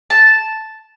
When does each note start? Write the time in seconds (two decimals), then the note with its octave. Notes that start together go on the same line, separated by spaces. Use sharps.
0.10 A5